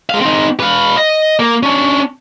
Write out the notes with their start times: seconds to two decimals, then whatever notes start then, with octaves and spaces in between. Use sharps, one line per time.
0.10 G#3 F5
0.21 C4 D#4
0.60 B4 F5
0.97 D#5
1.40 A#3
1.63 C#4 D4